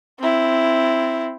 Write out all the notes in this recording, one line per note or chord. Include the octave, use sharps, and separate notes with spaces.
C4 E4